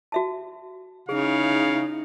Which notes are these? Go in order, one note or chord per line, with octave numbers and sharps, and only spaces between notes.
F#4 E5 A5
C#3 D#4 E4 G#4 F5